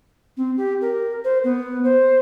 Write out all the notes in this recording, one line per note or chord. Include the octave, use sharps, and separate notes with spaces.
C4
G4
A#4
C5
B3
C5